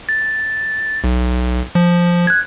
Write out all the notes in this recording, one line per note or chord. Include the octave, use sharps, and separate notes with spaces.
A6
B1
F3
F#6 G#6